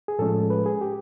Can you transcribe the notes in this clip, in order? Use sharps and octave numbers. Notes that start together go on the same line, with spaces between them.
G#4
A2 F3 G#3 C#4 A4
B4
G#4
G4